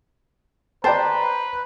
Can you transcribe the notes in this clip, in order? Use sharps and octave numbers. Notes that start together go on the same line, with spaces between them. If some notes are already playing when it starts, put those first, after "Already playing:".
B4 C5 D5 G5 A5 A#5